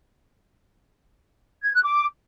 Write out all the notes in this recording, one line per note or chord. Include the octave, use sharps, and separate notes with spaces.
G#6
F#6
D6